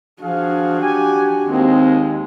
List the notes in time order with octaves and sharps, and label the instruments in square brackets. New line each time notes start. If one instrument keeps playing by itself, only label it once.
[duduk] F3 [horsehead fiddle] D4 F#4 [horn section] G#4 F5
[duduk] G4 [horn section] G#5
[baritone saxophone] D#2 [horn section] G#3 [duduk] C4